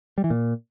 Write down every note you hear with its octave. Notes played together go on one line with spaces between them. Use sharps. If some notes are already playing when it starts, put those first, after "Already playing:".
G3
E3
A#2